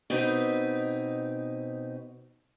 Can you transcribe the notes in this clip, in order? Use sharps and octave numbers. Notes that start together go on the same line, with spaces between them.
B2 C4 D#4 B4